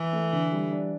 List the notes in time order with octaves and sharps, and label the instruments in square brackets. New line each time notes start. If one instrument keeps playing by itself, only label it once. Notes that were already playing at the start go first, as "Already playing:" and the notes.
Already playing: [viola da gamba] E3
[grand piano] A3
D3
G3
D4